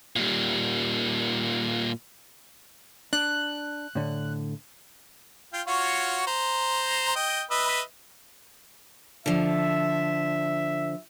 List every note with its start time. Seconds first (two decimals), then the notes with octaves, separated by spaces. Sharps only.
0.16 A#2 G3
3.13 D4 F#6
3.95 A2 D3
5.53 F4 G5
5.67 F4 F#4 C#5
6.27 C5 A#5
7.16 D#5 G5
7.51 B4 D#5 E5
9.26 D3 F3 E5